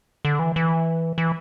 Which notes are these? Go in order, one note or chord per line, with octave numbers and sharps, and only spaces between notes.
D3
E3
E3
E3